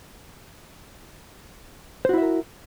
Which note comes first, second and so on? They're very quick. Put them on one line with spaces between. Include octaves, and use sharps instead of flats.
C5 F#4 E4 E5 A#4